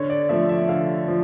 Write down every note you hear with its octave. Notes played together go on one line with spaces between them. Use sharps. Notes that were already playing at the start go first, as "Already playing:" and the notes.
Already playing: D3 C#5
D5
F3 A3 E5
E5
D3 F5
F3